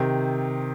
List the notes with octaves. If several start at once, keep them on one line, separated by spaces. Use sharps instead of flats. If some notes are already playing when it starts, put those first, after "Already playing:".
Already playing: C3 D#3